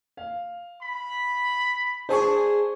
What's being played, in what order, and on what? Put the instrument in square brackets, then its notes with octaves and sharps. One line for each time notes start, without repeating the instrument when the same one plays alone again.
[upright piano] F5
[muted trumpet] B5
[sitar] D4 G#4 [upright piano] C5 A5 C#6